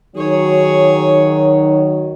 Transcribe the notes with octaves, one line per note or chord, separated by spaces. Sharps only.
D#3 F#3 G#4 C#5